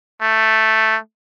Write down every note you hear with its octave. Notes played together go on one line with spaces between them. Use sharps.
A3